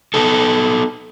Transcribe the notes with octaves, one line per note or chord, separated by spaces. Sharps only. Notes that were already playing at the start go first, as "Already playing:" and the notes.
B3 D#4 A4